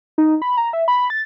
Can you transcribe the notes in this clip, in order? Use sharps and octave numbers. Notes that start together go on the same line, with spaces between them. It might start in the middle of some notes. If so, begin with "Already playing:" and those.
D#4
B5
A#5
E5
B5
A6